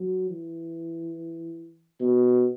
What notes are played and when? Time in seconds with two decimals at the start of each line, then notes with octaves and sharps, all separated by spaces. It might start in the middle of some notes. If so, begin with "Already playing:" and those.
Already playing: F#3
0.29 E3
2.00 B2